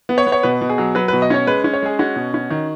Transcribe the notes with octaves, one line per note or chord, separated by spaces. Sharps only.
B3
C#5
B3
C#5
B2 B4
B2
G#4
F#3
F#3 B4
B2 B4
D#5
C#4 C#5
G#3 B4
C#4
C#5
G#3 G#4
C#4 F#4
B2
C#4
D#3